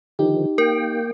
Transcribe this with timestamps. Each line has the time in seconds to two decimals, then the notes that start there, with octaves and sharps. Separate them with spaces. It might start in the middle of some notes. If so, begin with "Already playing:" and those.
0.19 D3 D#3 F3 D#4 G4
0.58 A#3 A#4 G5